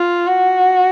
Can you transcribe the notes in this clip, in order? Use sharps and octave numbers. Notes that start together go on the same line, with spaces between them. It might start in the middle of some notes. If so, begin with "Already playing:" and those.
Already playing: F4
F#4